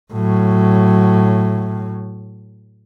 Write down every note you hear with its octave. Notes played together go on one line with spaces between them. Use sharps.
A2 F#3